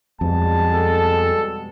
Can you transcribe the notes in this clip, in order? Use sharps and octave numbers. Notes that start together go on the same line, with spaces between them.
F2 B2 G3 G#3 A5
A4